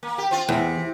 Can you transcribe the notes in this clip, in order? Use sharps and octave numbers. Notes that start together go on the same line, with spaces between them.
A#3
G4
C4 F4
E2 C3